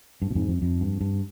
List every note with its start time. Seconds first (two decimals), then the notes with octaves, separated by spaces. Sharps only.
0.22 G2
0.31 B2
0.35 F2 G#2
0.48 F2
0.62 F2
0.81 G2
1.01 G2